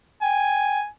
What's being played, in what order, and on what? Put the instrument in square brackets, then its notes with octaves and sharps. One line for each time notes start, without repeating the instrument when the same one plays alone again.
[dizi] G5 [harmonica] G#5